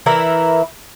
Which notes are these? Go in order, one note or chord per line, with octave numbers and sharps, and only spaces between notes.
E3 E4 A#4